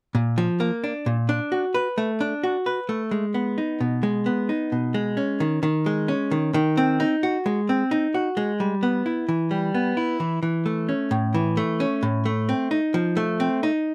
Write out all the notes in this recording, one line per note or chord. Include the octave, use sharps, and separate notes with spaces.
A#2
F3
A#3
D4
A#2
D4
F#4
B4
A3
D4
F#4
B4
A3
G#3
B3
D#4
B2
G#3
B3
D#4
B2
G#3
C#4
D#3
D#3
G#3
C#4
D#3
D#3
C4
D#4
F#4
G#3
C4
D#4
F#4
G#3
G3
B3
E4
E3
G3
B3
E4
E3
E3
A3
C#4
A2
E3
A3
C#4
A2
A3
C4
D#4
F3
A3
C4
D#4